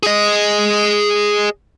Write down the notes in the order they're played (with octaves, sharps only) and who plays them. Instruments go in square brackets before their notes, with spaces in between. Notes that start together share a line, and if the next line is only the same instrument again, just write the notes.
[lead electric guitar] G#4 D#5